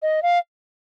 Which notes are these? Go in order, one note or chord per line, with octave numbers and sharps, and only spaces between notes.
D#5
F5